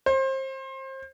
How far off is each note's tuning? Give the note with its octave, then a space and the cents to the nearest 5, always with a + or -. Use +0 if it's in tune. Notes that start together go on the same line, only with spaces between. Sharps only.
C5 +30